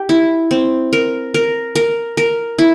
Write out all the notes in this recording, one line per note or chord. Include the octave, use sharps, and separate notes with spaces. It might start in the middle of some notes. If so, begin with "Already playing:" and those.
Already playing: G4
E4
C4
A#4
A#4
A#4
A#4
E4